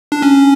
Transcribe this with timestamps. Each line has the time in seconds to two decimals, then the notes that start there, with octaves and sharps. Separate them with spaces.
0.12 D4
0.22 C#4